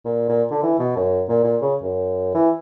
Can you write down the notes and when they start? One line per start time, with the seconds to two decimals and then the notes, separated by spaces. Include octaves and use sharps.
0.05 A#2
0.29 A#2
0.51 D3
0.63 E3
0.79 B2
0.96 F#2
1.29 A#2
1.44 A#2
1.62 C#3
1.82 F#2
2.34 E3